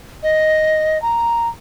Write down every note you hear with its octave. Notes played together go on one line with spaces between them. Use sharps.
D#5
A#5